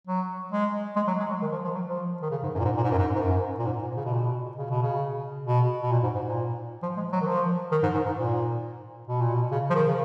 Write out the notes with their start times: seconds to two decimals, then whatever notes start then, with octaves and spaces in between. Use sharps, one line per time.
0.07 F#3
0.52 G#3
0.96 G#3
1.08 F#3
1.20 G#3
1.30 F#3
1.42 D#3
1.52 F3
1.65 F3
1.75 F#3
1.87 F3
2.22 D#3
2.31 C#3
2.43 G#2
2.55 F#2
2.60 A#2
2.65 G#2
2.77 A#2
2.84 G#2
2.91 F#2
2.99 G#2
3.15 G#2
3.22 F#2
3.59 A#2
3.66 G#2
3.82 A#2
3.97 C#3
4.06 B2
4.13 A#2
4.21 B2
4.57 C#3
4.70 B2
4.83 C#3
5.47 B2
5.83 B2
5.92 A#2
6.03 G#2
6.15 G#2
6.26 A#2
6.83 F3
6.97 G#3
7.12 F#3
7.21 D#3
7.27 F3
7.72 D#3
7.83 G#2
7.94 G#2
8.06 G#2
8.17 A#2
9.08 B2
9.22 A#2
9.34 B2
9.52 C#3
9.70 F3
9.75 D#3
9.87 C#3